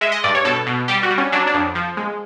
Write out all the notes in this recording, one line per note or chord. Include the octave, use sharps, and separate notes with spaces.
G#3 E5
D#5
G2 D5
C#5
B2 A4
B2
G3 G4
F#4
G3
C#4
F#3 D4
D4
F2
F3
G#3